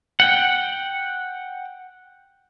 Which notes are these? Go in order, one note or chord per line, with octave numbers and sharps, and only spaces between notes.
F#5 G5